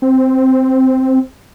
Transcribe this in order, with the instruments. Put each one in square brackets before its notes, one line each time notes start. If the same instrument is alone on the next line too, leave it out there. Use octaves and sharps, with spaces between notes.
[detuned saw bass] C4